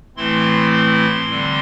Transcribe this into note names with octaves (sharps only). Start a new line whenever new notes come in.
A2 E3 A3 C4 E4 C6
C6
D3 G3 C4